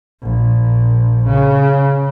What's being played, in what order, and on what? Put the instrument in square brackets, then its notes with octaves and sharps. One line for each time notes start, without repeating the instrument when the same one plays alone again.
[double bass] A#1
C#3